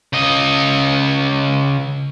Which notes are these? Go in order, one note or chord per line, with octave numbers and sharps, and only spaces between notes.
C#3 D#5